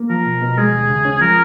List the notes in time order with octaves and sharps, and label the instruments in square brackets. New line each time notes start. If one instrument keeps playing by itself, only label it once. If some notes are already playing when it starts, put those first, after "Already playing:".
Already playing: [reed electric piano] A#3
[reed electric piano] F3 [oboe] A#4
[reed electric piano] B2
B2
[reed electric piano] G#3 [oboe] G#4
[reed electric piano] D#2
C#3
C#4
[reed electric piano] F3 [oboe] A#4